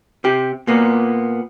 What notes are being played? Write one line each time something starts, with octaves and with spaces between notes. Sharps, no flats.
C3 G4
A#2 A#3 B3